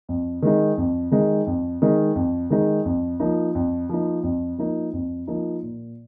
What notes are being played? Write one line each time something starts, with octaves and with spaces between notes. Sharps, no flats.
F2
D#3 G#3 D#4
F2
D#3 G#3 D#4
F2
D#3 G#3 D#4
F2
D#3 G#3 D#4
F2
F3 A#3 D#4
F2
F3 A#3 D#4
F2
F3 A#3 D#4
F2
F3 A#3 D#4
A#2